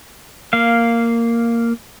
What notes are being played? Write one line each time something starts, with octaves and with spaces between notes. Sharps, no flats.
A#3 F5